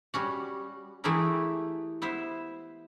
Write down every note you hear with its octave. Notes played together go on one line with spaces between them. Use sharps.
G3 C#4 F#4
E3 A3 E4 G4 G#4 A#4
B3 E4 C5 E5